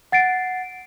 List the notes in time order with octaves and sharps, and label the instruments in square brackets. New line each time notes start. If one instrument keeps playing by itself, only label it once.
[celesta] F#5 A6 C7 D7